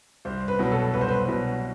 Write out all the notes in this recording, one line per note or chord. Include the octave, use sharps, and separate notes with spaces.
C2 C5
B4
B2 F#3 B4
A4
C2 B4
C5
B4
B2 F#3 B4